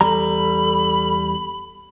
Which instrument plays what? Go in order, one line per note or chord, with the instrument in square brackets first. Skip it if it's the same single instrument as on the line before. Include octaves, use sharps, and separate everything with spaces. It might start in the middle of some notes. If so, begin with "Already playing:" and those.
[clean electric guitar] E2 G3 A#5 [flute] A4 [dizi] B5